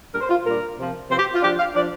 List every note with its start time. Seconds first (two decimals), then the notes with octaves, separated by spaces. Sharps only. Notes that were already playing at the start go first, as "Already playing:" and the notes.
0.12 A#2 G3 D4 A#4
0.20 C5
0.29 F4
0.45 A#2 G3 D4 A#4
0.78 C3 F3 C4
1.09 C3 F3 C4 C5
1.18 G4
1.34 F4
1.42 F3 D4 G4
1.59 F5
1.74 F3 D4 D5